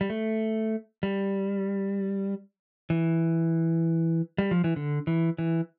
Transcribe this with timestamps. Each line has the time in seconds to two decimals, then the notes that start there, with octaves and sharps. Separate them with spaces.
0.01 G3
0.10 A3
1.03 G3
2.90 E3
4.38 G3
4.51 F3
4.64 E3
4.76 D3
5.07 E3
5.38 E3